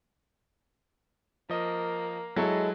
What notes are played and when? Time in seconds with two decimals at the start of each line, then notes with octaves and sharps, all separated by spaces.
1.49 F3 A#3 D#5
2.36 F#3 G#3 E4 A4 C#5